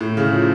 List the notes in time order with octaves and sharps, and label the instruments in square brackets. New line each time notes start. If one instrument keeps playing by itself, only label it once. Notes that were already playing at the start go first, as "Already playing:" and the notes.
[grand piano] A2
C#3
F3